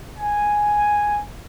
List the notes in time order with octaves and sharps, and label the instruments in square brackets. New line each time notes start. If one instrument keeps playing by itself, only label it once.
[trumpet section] G#5